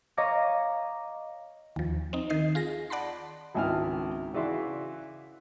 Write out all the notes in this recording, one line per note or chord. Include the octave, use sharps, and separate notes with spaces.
C#5 D#5 F5 A#5 D6
D#2 F3
C4 D#4
D#3 D#5 C7
F4 G#4 A#6
D5 F#5 A5 B5 C6
G#1 C#2 E4 G#5 A5 F6
C#3 E3 F#4 D5 E5 C6